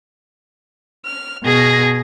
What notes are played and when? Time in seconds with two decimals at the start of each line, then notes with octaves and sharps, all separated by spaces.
1.06 F6
1.44 B2 G#4 A#6